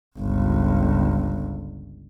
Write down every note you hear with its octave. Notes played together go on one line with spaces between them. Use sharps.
G1 C#2